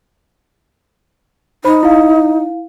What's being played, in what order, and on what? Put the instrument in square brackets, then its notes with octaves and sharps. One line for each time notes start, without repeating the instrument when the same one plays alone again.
[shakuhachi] D#4 [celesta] C5 B5
[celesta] E4 F5